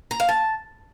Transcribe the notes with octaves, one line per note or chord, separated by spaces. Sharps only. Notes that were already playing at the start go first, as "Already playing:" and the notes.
A#5
F5
A5